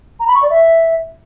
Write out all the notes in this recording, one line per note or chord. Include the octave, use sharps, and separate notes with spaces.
A#5
B5
C#6
D5
E5